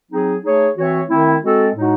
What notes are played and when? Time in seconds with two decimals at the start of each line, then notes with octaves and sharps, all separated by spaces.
0.10 F#3 C4 D#4 G#4
0.43 A3 D#4 G#4 C#5
0.76 E3 C4 F#4 C#5 E5
1.09 D#3 A3 C4 E4
1.42 G#3 C4 F#4 A4
1.75 A2 G#3 D#4 F#4